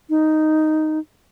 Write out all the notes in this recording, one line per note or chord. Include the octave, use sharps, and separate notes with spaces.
D#4